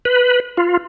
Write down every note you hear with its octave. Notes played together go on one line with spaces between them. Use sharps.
B4
F4